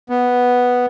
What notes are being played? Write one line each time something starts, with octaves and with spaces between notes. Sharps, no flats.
B3